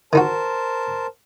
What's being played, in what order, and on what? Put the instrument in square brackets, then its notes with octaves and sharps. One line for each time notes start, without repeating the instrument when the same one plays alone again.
[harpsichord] D#3 D#4 F#4 [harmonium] A#4 C5 A5